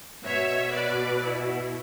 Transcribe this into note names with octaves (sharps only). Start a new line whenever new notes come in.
B2 C#5 E5
B4 D5
E4